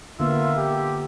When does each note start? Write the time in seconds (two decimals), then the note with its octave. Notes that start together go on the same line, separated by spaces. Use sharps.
0.20 D3 A#3 B3 F4 E5
0.57 G4